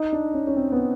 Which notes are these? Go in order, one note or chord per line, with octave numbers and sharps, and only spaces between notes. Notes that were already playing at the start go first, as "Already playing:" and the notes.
Already playing: D#4
D4
C#4
C#4
C4
B3